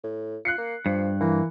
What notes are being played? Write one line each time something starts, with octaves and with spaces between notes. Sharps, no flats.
A2
F4 F#6 C7 C#7
A#3
G2 F3
E3 A#3